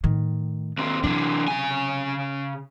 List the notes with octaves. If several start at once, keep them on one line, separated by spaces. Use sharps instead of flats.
A2 D#3
D#2 C4
C3 E3 F#3 D4
C#3 G#5